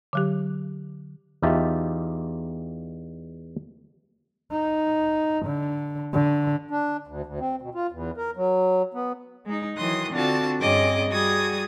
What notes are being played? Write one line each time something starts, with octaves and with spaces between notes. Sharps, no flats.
D3 F#3 G4
E2 D#4 F4 G4 E5 A5
D#4
D3
D3
D4
D2
D2
C4
B2
F4
E2
A#4
F#3
B3
G#3 D#4
D#3 E3 F#3 C6 D#6 F#6
D3 C4 D4 F4 F#4 A5
G2 C4 C#4 G#4 D#5 D6
G3 F#4 G#4 D#6 G#6